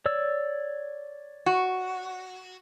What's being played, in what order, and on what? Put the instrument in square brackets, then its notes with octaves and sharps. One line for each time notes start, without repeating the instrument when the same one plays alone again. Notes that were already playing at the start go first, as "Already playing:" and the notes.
[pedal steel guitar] C#5 D5 E6
[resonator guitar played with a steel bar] F#4